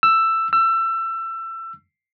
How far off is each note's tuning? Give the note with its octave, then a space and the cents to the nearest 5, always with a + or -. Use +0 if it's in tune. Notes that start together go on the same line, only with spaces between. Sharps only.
E6 +10
E6 +25